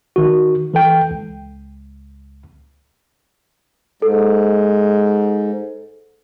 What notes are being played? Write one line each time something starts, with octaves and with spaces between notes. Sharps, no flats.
D#3 F#4
E3 A4 G5
C#2
G#2 A4